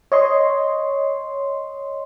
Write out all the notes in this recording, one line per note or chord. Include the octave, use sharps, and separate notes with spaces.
C#5 D#5 C6